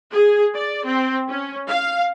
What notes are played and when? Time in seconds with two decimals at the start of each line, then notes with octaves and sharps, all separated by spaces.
0.13 G#4
0.55 D5
0.86 C4
1.29 C#4
1.68 F5